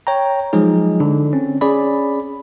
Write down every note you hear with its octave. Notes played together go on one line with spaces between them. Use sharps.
C#5 G5 A#5
F3 F#3 G#3 D#4 G#4
D3 D4
C4 C#4
C#4 G#4 D5 B5